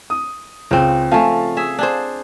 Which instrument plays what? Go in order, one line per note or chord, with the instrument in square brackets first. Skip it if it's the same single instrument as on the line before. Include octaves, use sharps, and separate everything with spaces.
[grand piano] D#6
[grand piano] C#2 [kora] C#3 C4
[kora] F3 A3 [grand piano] F5 G#5 A5
[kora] G#4 E5
D4 G#4 C5